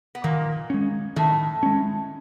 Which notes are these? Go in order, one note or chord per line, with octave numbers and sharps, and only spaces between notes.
B3
A#2 D#3 A#3
G#3 C#4
A2 D#3 A3
G#3 C#4